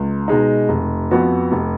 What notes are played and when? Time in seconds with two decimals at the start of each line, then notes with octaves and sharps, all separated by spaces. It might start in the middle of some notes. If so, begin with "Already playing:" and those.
Already playing: C#2
0.28 B2 G#3 D#4
0.69 F1
1.11 F2 F3 B3 F#4
1.52 F1